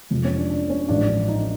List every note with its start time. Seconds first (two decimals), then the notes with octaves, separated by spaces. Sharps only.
0.10 F1 F2 C3 F3 G#3
0.24 C#4
0.36 D4
0.50 D4
0.69 C#4
0.88 A1 G#2 F3 G#3 D4
1.08 D4
1.28 D#4